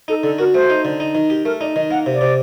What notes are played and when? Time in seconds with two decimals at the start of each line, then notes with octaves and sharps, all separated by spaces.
0.08 D#4 A4
0.23 D3 A4
0.38 F#4 A#4
0.54 A3 C5
0.70 D#4
0.85 D3
1.00 D#4
1.15 D#3
1.30 G4
1.45 A3 A#4
1.61 D#4 D5
1.76 D#3 D#5
1.91 A#3 F#5
2.06 C3
2.14 D5
2.21 C3